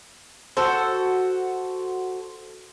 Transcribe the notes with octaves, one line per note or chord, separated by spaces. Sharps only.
F#4 A4 C5